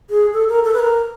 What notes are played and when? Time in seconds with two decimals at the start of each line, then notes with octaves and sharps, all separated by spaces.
0.10 G#4
0.33 A4
0.49 A#4
0.64 A4
0.74 B4
0.79 A#4